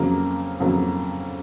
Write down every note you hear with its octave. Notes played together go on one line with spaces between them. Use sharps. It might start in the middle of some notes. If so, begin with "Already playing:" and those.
Already playing: F2 C#3 F#3 A#3
F2 C#3 F#3 A#3